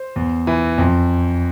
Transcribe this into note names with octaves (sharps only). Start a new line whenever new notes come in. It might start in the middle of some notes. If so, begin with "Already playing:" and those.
Already playing: C5
E2
E3
F2